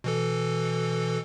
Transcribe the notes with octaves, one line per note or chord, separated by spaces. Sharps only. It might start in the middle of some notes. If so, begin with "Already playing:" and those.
B2 E3 A4